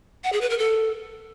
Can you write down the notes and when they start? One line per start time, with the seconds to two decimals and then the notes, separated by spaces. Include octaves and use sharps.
0.24 F#5
0.33 G#4
0.41 B4
0.50 A#4
0.59 A4